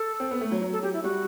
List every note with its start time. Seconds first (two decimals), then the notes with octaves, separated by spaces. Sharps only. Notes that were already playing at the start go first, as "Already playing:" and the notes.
Already playing: A4
0.20 C4
0.31 B3
0.41 A3
0.52 F#3
0.62 F#3
0.73 A4
0.82 F#3 G4
0.93 E4
1.03 G3 F#4